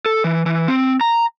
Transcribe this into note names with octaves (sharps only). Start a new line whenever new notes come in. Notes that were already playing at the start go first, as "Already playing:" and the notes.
A4
E3
E3
C4
A#5